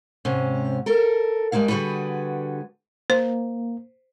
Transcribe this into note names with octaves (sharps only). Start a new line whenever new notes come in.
G#2 C3 C#4
A4 A#4
G3 G#3 A#3 E4 F5
D3 G3 F#4 G#4 B4
A#3 C5